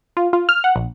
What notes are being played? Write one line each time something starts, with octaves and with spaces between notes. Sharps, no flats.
F4
F4
F6
F#5
A#1